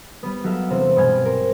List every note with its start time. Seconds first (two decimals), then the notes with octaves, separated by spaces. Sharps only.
0.23 G3 B3
0.44 F#3 G4 A4 E5 F5
0.70 E1 C3 C4 E7
0.96 G2 B2 B3 G5 G#5 F6
1.25 A#4 C5